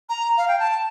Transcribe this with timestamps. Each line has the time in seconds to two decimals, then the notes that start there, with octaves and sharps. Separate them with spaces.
0.09 A#5
0.37 F5
0.48 G5
0.59 A5